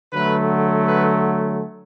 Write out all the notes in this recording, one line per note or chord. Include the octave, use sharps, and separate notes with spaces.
D3 F#3 A3 B4
B4